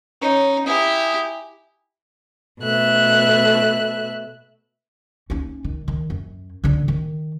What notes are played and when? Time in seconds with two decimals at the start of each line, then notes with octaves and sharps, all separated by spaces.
0.22 C#4 D#4 C#5
0.66 E4 G4 G#5 D#6
2.62 B2 A3 E5 F#6
5.30 C#4 D#4
5.64 D#3
5.88 D#3
6.10 F#2
6.64 D3 D4
6.88 D#3